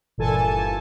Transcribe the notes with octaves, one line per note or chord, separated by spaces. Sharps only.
G1 A#2 E3 A4 G#5 A5